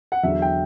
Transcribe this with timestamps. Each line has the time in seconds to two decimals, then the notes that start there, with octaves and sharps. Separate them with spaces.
0.12 F#5
0.23 E2 D3 F#3 E5
0.42 G5